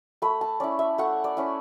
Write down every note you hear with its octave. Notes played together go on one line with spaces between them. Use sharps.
A3 B5
A5
C#4 E4 D5
E5
A3 F#5
D5
C#4 E4